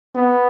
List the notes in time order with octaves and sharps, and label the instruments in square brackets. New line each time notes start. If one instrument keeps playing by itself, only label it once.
[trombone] B3